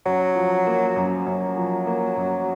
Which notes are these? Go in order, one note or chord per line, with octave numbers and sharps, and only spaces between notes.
F#2 F#3
F3
A#3
F#2
F#2 F#3
F3
A#3
F#2